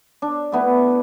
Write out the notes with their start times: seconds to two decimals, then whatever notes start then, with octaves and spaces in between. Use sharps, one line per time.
0.22 D4
0.52 A3 B3 E4